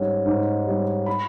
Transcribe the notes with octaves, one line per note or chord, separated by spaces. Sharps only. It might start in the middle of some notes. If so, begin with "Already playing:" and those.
Already playing: G#2 G3 C#4
G#2
G3 C#4
B5